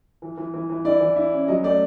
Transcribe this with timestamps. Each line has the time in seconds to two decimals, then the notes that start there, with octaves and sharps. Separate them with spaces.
0.22 E3
0.37 E3
0.54 E3
0.70 E3
0.85 E4 D5
1.00 E3
1.16 E4
1.32 C#4
1.48 F#3 D#5
1.64 A3 D5